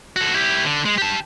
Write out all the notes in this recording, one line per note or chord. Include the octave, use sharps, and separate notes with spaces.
F#4 A4
E4 G4
D3
G#3
G4 A5